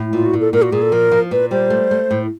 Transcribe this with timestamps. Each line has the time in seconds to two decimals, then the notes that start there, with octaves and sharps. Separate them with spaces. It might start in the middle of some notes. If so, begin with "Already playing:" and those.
Already playing: A2
0.13 A#2 F4
0.26 F#4
0.33 A#2
0.40 A4
0.53 A#2 A#4
0.62 F#4
0.72 A#2 G#4
0.82 A4
0.92 F3 A#4
1.12 F3
1.31 A#2 B4
1.51 G3 C5
1.70 A3
1.91 A3
2.11 A2